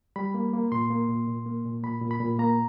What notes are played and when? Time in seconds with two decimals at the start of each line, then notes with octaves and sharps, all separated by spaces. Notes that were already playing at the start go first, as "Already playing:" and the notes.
0.16 G3 B5
0.34 A#3
0.53 A#3
0.72 A#2 C6
0.90 A#3
1.09 A#2
1.28 A#2
1.46 A#3
1.65 A#2
1.83 A#2 B5
2.01 A#2
2.11 B5
2.21 A#2
2.39 A#3 A#5